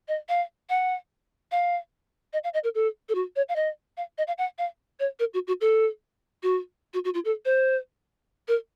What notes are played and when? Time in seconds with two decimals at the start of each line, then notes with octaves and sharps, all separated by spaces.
0.08 D#5
0.29 F5
0.69 F#5
1.52 F5
2.33 D#5
2.44 F5
2.54 D#5
2.64 A#4
2.75 A4
3.09 A4
3.15 F#4
3.36 C#5
3.49 F5
3.56 D#5
3.97 F5
4.18 D#5
4.27 F5
4.38 F#5
4.58 F5
5.00 C#5
5.19 A#4
5.34 F#4
5.48 F#4
5.61 A4
6.43 F#4
6.94 F#4
7.05 F#4
7.14 F4
7.25 A4
7.45 C5
8.48 A#4